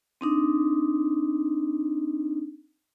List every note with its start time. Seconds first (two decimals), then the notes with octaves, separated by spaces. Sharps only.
0.21 C4 D4 D#4